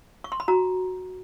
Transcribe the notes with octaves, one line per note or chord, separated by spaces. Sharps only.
C#6
C6
B5
F#4 A#5